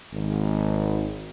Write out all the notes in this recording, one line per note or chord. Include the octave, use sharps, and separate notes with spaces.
G#1